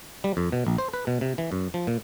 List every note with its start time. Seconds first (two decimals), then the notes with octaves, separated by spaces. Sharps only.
0.24 G3
0.37 F2
0.52 B2
0.67 A#1
0.78 C5
0.93 B4
1.07 B2
1.21 C3
1.38 E3
1.52 F#2
1.74 F3
1.87 A#2